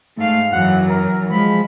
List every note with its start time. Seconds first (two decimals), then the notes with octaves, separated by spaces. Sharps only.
0.17 G#2 A3 F5
0.52 F#2 E3 F#3 F#5
0.89 A#4
1.30 F3 G#3 B5